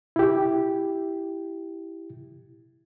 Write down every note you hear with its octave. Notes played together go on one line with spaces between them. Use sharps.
E4 G4